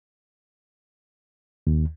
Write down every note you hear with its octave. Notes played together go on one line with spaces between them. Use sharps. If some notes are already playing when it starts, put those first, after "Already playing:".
D#2